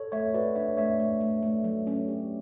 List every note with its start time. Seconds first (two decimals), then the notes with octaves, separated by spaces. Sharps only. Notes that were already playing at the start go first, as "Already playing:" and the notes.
Already playing: A4 C#5
0.12 A3 C#5 E5
0.34 F#4 B4 D5
0.56 D4 C#5 E5
0.77 A3 C#5 E5
1.00 A3
1.21 A3
1.43 A3
1.64 F#3
1.87 C#4
2.08 G4